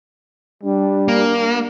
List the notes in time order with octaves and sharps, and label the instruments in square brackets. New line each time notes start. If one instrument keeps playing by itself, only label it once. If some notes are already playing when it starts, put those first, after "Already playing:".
[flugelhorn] G3 [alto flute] D4
[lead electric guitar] A#3